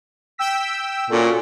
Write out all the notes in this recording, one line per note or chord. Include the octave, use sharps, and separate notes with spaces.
G5 E6 B6
A#2 C#4 F#4 A4